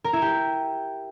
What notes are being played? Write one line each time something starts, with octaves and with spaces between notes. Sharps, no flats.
A#4
E4
G4